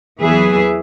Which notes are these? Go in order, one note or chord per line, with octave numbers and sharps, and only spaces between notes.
E2 E3 F#3 G#4 B4 E5